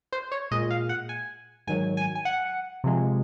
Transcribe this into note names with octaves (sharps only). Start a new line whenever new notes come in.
C5
C#5
A#2 G#3 D#5
F5
F#5
G#5
G#2 D#3 F#3 G#5
G#5
G#5
F#5
C3 F3 G#3